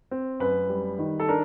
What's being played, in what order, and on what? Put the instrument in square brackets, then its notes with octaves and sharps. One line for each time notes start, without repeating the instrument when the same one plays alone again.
[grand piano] C4
[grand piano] F#2 [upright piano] B4
[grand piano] G3
D#3
[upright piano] A4
[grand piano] D4 [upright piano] A#4